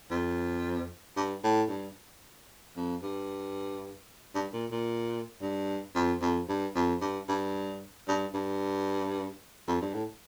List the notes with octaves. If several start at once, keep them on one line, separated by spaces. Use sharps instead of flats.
F2
G2
A2
G2
F2
G2
G2
A#2
A#2
G2
F2
F2
G2
F2
G2
G2
G2
G2
F2
G2
A2